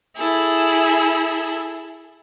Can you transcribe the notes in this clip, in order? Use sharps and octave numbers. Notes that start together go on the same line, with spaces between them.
E4 G#4 A4